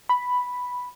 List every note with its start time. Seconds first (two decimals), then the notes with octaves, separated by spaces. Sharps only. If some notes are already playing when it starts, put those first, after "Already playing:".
0.09 B5